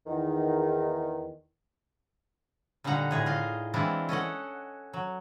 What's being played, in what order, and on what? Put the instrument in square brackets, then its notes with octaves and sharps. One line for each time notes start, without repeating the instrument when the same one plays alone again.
[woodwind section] E2 D#3
[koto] A#2 D3 G3 D#4 F#5 A#5
A2 G#4 A#5
F4 D#5 F5
E3 G#3 C4 D4 E4 F4
C#4 A4 D#5 F#5
F#3